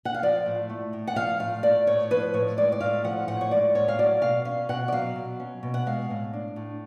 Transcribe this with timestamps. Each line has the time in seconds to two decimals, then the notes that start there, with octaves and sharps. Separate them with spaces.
0.05 F#5
0.14 F5
0.23 F3 D5
0.46 A2
0.70 A3
0.93 A2
1.07 F#5
1.16 F3 F5
1.40 A2 F5
1.63 A3 D5
1.87 A2 C#5
2.10 F3 B4
2.34 A2 C#5
2.57 G#3 D5
2.72 D5
2.81 A2 F5
3.04 F3 F#5
3.28 A2 F#5
3.41 C#5
3.51 G#3 D5
3.75 A2 C#5
3.88 F5
3.98 F#3 D5
4.21 B2 F5
4.45 C#4 F5
4.69 B2 F#5
4.88 D5
4.92 F#3 F5
5.16 B2
5.40 C#4
5.63 B2
5.74 F#5
5.86 G#3 F5
6.10 A2
6.33 D4
6.56 A2